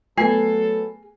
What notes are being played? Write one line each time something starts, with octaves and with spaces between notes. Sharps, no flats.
F#3 A3 B3 G#4 A4 C7